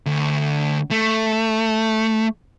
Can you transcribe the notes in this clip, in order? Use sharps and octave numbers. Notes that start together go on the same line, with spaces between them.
D2
A3